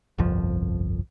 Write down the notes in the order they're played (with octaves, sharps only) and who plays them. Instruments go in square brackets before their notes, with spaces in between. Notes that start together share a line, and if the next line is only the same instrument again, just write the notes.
[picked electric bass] G1 C2 F2 F3